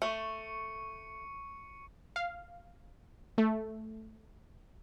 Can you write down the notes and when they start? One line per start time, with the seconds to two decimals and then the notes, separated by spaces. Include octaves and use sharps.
0.02 A3 C#6 C#7
2.16 F5
3.38 A3